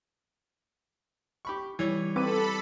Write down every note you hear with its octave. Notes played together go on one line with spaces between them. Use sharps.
G4 B5 C#6
E3 G3 C#5
C4 D#4 A4 B4 B5 D6 D#7